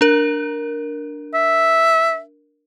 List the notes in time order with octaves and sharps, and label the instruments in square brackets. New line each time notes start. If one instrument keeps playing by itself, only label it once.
[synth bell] D4 A#4
[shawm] E5